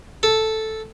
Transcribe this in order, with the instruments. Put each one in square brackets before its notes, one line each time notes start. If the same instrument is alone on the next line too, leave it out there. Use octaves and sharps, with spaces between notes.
[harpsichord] A4